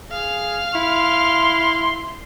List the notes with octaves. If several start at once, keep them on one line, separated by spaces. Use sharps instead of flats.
G#4 F5 F6
E4 C6